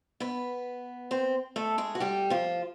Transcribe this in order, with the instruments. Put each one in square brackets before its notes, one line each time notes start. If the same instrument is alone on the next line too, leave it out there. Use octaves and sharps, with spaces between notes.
[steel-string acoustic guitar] B3 B4
C4 C5
A3 A4
G#3 G#4
F#4
G3 G4
F3 F4